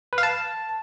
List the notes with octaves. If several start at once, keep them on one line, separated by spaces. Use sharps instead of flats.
B4
F5
A5